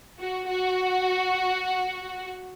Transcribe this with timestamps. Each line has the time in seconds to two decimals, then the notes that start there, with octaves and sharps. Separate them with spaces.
0.20 F#4
0.48 F#4